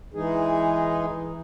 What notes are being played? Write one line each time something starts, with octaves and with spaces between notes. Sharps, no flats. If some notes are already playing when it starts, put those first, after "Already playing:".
E3 G#3 D#4 G#4